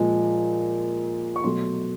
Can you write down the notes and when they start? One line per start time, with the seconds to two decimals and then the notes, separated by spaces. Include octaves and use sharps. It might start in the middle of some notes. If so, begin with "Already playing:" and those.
Already playing: A#2 F3 G#3
1.36 C#6
1.44 B2 F#3 A3 C6